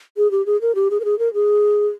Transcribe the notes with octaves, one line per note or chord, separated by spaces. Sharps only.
G#4
G4
G#4
A#4
G4
G#4
A#4
G#4
A#4
G#4